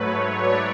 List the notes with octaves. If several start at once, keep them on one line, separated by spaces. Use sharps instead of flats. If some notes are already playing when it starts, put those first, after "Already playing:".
Already playing: G#2 F#3 A3 B4 C#5
D5